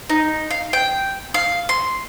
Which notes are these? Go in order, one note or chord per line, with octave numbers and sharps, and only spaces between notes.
D#4
F5
G5
F5
C6